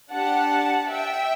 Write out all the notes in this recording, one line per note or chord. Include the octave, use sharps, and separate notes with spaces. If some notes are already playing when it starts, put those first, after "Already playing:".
D4 G4 F#5 A5
E5 G5